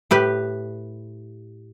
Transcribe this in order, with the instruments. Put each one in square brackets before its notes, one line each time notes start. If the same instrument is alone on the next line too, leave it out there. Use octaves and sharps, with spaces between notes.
[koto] A2 G4 B4